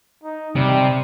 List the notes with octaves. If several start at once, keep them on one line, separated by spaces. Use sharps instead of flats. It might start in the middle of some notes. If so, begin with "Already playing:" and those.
D#4
C3 G3